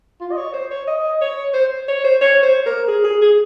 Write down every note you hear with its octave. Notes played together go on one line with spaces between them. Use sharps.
F4
D#5
C#5
C5
C#5
D#5
C#5
C5
C#5
C5
C#5
C5
A#4
G#4
G#4
G#4